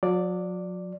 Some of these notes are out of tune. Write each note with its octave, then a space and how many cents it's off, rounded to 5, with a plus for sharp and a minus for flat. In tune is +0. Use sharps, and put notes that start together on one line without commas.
F#3 -45 D5 +0